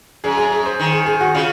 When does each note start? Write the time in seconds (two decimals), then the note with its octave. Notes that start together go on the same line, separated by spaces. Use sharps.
0.24 F#2 G#4
0.37 G#4
0.52 G#4
0.66 C5
0.79 D#3
0.93 G#4
1.06 G#4
1.20 F#4
1.35 C#3 F4